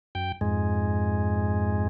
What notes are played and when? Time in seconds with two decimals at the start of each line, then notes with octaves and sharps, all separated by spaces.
0.15 F#2 G5
0.41 F2 G#2 G#3